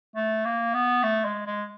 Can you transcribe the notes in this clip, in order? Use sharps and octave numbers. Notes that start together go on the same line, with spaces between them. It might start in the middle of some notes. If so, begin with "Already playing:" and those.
A3
A#3
B3
A3
G#3
G#3